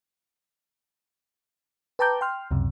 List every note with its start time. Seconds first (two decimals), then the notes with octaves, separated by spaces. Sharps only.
1.99 B4 G5 A5 A#5 D6 G6
2.21 G5 C6 F6
2.51 C#2 F#2 C3